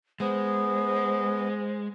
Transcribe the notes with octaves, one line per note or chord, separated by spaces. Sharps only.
G#3 B3 C5